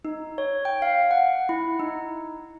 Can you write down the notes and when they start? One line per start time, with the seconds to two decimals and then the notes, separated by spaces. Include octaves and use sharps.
0.05 D#4
0.38 C#5
0.65 G5
0.82 F5
1.11 F#5
1.49 E4
1.80 D#4